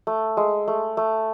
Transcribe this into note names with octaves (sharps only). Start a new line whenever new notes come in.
A3
G#3
A3
A3